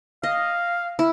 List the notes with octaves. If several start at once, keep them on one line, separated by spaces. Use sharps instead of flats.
D#5 F5
E4